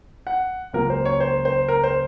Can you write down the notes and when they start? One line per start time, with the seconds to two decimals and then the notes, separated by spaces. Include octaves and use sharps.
0.27 F#5
0.73 C#2 C#3 F#3 A#3 F4 A#4
0.90 C5
1.05 C#5
1.20 C5
1.45 C5
1.68 A#4
1.84 C5